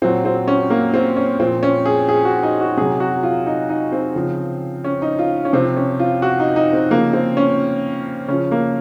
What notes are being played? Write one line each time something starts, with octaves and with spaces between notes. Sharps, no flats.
A#2 F#3 C4
C4
C#4
A#3
C4
C#4
A#2 F3 C4
C#4
G#4
G#4
F#4
D#4
F#4
C3 F#3 G#4
F#4
F4
D#4
D#4
C4
C#3 F3
C#4
D#4
F4
C#4
C3 F3 C4
C#4
F4
F#4
D#4
D#4
C4
C#3 F3 A#3
C4
C#4
C#3 F3 C#4
A#3